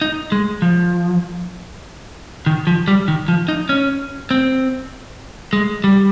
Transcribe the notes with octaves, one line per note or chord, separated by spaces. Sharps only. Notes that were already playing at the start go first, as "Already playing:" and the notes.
D#4
G#3
F3
D#3
F3
G3
D#3
F3
D#4
C#4
C4
G#3
G3